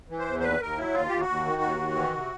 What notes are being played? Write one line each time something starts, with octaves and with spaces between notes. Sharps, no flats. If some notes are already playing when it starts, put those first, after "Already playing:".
E3
C5
E2
C5
D#2 B4
D#2 A#4
F#3 E4
D#2 F4
D#2 G4
F#4
D#2
D#3
D#2
D#3
E3
C3